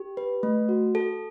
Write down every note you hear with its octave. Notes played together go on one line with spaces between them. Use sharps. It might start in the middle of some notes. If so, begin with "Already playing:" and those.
Already playing: G4
B4
A3
F#4
A4